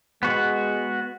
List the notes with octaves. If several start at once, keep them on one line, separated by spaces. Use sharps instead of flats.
G#3 B3 F#4